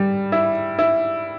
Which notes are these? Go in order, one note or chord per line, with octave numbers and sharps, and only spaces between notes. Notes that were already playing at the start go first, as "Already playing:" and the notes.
Already playing: G3
E4
E4